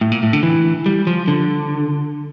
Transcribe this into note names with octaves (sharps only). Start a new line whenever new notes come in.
A2
A#2
A2
D3
E3
G3
F3
D3